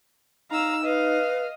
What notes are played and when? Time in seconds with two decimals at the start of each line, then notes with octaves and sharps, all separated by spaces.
0.51 D#4 F5 A#5 E6
0.84 B4 D#5 F5